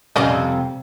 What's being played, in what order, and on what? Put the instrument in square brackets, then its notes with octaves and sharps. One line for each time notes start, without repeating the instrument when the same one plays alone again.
[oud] F2 C3 G3 [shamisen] C#4 D5 D#5